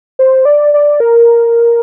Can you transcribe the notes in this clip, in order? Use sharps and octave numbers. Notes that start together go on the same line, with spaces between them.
C5
D5
D5
A#4